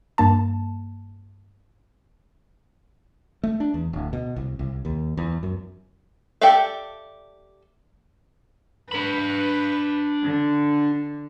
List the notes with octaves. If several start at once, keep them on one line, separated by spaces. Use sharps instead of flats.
G2 A#3 A5
A3
D4
E2
D1
B2
C2
C2
D#2
E2
F#2
G4 A4 D5 E5 F5
D4 B4 B5
D3